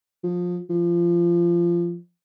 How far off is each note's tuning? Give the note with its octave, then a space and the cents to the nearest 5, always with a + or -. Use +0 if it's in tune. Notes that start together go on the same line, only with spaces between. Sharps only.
F3 +25
F3 -20